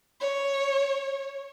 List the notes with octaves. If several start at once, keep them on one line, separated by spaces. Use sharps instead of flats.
C#5